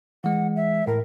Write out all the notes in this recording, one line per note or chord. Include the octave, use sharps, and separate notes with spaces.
E3 G#3 F#5
E5
A2 A#4